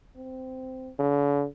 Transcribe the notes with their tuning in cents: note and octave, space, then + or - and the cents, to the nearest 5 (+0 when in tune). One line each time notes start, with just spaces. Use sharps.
C4 -15
D3 -45